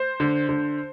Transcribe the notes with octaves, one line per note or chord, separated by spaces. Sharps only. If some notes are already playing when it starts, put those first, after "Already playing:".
Already playing: C5
D3
D3